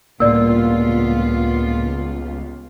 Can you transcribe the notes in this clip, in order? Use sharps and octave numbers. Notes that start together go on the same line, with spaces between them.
C#2 A2 G3 A#3 B3 F4 D5 E6